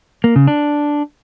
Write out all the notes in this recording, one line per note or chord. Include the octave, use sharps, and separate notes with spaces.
A#3
C#3
D4